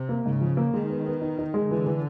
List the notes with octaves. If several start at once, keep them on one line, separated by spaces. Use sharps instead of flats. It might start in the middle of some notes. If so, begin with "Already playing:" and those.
Already playing: C3
A#3
G#2 C#3
F3
A#3
D#3 G#3
B3
B3
D#4
D#4
G#3
D3 E3
E3